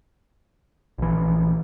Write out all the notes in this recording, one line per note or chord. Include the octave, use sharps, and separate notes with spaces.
A#1 E3